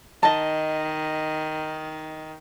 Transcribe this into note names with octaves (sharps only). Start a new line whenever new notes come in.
D#3 D#5 A5